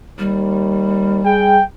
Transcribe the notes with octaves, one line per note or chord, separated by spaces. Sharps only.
D#2 G3
G#4 G5